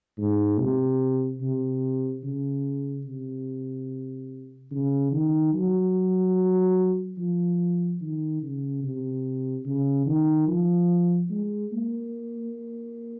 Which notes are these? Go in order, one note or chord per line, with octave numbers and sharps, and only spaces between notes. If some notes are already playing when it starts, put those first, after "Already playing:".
G#2
C3
C3
C#3
C3
C#3
D#3
F#3
F3
D#3
C#3
C3
C#3
D#3
F3
G#3
A#3